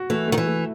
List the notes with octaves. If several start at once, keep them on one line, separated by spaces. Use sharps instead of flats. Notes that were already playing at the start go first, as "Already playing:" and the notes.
Already playing: F#4
E3 A3
D#3 A3
E3
A3